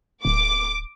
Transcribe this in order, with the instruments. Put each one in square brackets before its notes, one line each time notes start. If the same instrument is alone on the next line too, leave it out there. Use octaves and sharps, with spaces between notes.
[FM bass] D1 [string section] D6